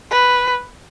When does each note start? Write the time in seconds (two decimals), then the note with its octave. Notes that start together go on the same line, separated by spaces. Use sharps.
0.11 B4